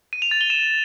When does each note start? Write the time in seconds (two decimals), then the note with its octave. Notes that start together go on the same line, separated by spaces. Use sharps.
0.13 D#7
0.22 F7
0.31 A6
0.41 G7
0.50 E7